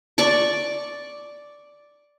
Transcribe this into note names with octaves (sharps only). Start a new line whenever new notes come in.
D5 C#6 D6